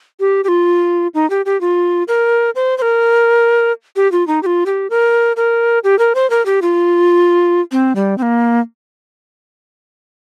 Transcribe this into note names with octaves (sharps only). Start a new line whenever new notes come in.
G4
G4
F4
D#4
G4
G4
F4
A#4
C5
C5
A#4
G4
F4
D#4
G4
F4
G4
A#4
A#4
G4
A#4
C5
A#4
G4
F4
C4
G3
C4
A#3